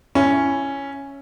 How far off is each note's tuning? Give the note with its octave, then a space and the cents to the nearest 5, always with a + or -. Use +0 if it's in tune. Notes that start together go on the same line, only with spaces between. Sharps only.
C#4 +0 E4 +20